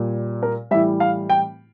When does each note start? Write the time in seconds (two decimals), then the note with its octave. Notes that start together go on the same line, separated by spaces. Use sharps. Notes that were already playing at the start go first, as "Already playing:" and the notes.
Already playing: A#2 G3
0.43 A#4
0.71 A2 E3 G3 E5
1.00 F5
1.30 G5